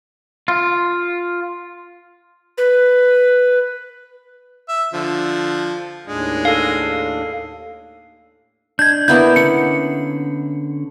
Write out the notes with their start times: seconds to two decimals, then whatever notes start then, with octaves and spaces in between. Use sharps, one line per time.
0.48 F4
2.58 B4
4.69 E5
4.93 D3 F3
6.07 D#2 A2 G#3 D4
6.45 A4 F5
8.79 D4 D#5 G6 G#6
9.08 A#3 B3 E4 G6
9.36 D3 C#4 F#5 C#7